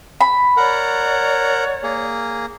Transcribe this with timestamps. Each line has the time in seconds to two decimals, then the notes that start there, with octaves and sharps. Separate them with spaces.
0.21 B5
0.57 A#4 C#5 D5 F#5
1.83 A#3 G#4